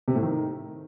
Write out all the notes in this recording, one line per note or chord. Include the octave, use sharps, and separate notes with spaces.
C3
A2
D#3